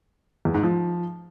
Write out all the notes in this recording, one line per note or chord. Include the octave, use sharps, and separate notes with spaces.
E2
G#2
F3